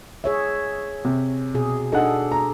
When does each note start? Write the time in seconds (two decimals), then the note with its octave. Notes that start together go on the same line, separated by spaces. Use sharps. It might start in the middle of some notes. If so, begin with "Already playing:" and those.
0.24 G#4 C#5 E5
1.05 C3
1.54 B2 G#4
1.92 D4 D#4 G#4 A4 F#5
2.32 A#5